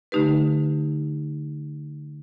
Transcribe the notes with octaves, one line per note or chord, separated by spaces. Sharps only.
D3 A3 D#4 G4 B4